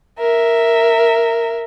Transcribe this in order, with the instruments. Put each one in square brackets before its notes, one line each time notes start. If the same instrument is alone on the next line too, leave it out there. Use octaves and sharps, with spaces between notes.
[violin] A#4 E5